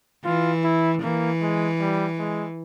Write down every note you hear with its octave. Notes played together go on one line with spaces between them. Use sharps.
E3 F4
E4
E3 A#3
G#3
G3
G#3